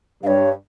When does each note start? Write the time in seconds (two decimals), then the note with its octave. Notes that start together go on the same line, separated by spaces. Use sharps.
0.23 G2 C#5 F5